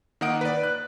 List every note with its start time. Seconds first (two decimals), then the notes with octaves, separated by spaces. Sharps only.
0.21 D#3 A#3 D#5 F#5 D#6 D7
0.41 B4 D5
0.64 F#6